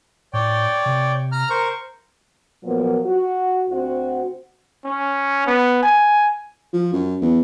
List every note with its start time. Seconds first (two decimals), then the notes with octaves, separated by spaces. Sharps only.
0.33 A2 C#5 D5 G5
0.86 C3
1.32 A#5 F6
1.50 A#4 C5 C#6
2.64 A#2 F3 F#3 A#3 B3
3.04 F#4
3.69 D2 C4 F#4
4.85 C#4
5.47 B3
5.83 G#5
6.73 F3
6.93 F#2
7.22 E2